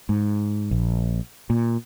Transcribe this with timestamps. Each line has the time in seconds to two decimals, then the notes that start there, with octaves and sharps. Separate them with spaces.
0.09 G#2
0.71 A#1
1.50 A#2